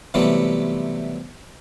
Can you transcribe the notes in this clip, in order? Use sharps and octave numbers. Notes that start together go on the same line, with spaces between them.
C3 E3 F#3 G3 A3 B3